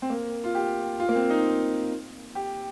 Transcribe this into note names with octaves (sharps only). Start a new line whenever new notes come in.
C4
A#3
F4
G4
F4
A#3
C4
D#4
G4